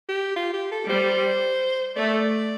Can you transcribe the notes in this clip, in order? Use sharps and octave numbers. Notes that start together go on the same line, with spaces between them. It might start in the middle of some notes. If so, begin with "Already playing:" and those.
G4
F4
G4
A4
G3 C5
A3 D5